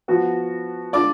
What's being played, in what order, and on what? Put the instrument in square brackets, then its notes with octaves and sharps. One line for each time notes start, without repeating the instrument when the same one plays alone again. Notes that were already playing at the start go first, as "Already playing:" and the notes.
[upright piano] F3 B3 F#4
[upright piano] G#3 D4 F4 [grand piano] D5 D6